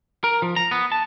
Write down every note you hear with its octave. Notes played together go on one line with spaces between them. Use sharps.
A#4
F3
A#5
B3
A5